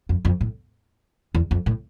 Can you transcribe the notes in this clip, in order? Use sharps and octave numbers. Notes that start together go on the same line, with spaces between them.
F2
F2
A2
E2
F2
A2